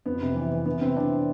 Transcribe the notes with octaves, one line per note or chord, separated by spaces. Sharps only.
F2 B3
C3
E3
E3
E3 B3
C3 C4
E3 D4